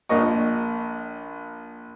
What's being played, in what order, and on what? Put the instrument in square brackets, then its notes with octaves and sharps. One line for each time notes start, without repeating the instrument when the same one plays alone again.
[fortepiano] A#1 A#2 A#4 D#5 C#6